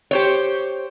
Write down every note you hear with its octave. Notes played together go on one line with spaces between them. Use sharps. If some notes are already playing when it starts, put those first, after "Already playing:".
G4 C5 C#5